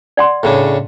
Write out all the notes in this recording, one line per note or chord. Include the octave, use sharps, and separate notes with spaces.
D5 F#5 C6
A2 C#3 D4